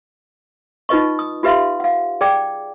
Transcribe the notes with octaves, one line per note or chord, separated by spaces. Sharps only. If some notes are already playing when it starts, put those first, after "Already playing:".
D#4 F4 B4 D#5 C#6
D#6
F4 G4 B4 E5 F5 C6
F5 F#5
G#4 D5 G5 D6